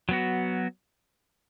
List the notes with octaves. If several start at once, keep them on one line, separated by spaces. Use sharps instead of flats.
F#3 B3 F#4